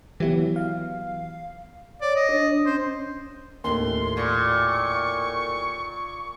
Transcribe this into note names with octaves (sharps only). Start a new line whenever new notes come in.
E3 F#3 B3 E4 G4
F5
C#5 D5
D#5
D4
C#4 C5
D#2 A2 C6
A#2 C#6